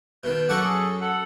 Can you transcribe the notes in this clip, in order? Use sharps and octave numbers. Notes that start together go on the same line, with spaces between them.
B2 D#3 G6
F#2 F#4 A4 F#5 C#6 D6
G#4 A4
A4 F#5